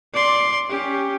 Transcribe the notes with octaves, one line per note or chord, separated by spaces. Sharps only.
D5 C6
C#4 G4